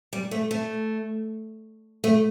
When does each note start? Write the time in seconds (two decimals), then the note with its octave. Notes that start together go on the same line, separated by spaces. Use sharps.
0.13 G3
0.31 A3
0.51 A3
2.04 A3